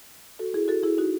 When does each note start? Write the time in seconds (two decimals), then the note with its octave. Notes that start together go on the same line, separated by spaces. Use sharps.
0.39 F#4 A4
0.54 E4 G#4
0.68 F#4 A4
0.83 E4 G#4
0.98 D#4 F#4